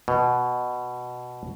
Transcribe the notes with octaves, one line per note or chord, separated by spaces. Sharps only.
B2